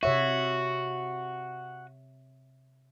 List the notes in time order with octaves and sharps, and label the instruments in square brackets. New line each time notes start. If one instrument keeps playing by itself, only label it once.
[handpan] C3 C#5 E5 [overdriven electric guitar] F#4